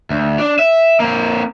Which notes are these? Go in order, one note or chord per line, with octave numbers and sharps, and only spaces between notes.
D2
D4
E5
A#3 C4